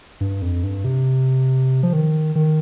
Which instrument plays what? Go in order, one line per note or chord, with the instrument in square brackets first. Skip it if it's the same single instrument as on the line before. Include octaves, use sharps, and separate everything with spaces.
[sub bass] G2
F2
G2
C3
F3
D#3
D#3